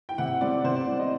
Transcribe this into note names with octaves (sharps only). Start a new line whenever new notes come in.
G5
C3 F#5
G3 C4 D5
C3 C5
D5
G3 C4
D#5